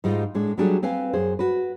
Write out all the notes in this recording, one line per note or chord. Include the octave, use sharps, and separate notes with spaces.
G#2 G3 G#3 D#4 F4
A2 G#3 D4
F#3 G3 A3 D4 G4 G#4
C4 B4 F5 G#5
F#2 G#4 C5
F#4 B4